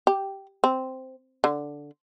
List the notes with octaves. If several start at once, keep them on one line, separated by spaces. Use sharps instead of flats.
G4
C4
D3